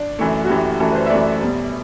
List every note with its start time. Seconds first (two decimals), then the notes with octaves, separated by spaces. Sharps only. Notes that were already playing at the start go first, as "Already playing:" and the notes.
Already playing: D4
0.19 F#2 E3 A3
0.44 F#4
0.49 F#2 E3 A3 G4
0.80 F#2 E3 A3 A4
0.91 B4
0.95 C5
1.06 E5
1.10 F#2 E3 A3 D5
1.41 B2 G3